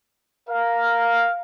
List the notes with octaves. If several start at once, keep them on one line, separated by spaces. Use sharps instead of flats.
A#4 F5